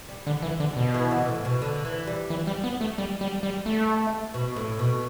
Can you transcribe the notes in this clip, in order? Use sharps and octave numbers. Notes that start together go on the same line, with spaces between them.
G3
D3
E3
D3
B2
E3
E3
A2
B2
D3
E3
G3
E3
G3
B3
A3
G3
G3
G3
A3
B2
A2
B2